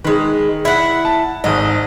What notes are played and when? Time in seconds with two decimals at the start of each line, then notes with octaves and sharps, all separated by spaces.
0.05 D#3 G#3 B4
0.65 E4 F#5
1.05 A5
1.44 G#1 G#2 D#5